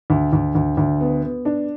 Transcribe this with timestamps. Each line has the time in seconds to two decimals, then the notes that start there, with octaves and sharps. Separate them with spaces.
0.10 D2
0.33 D2
0.55 D2
0.77 D2
1.01 B3
1.23 B3
1.45 D4